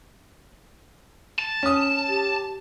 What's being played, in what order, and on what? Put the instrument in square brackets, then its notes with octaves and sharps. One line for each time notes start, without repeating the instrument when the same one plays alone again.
[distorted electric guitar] A5
[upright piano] C#4 D#6
[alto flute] G4